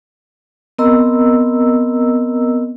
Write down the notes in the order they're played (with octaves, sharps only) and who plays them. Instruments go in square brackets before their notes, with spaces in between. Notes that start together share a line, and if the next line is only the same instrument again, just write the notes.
[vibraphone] B3 C4 A#4 D#5 A#5 E6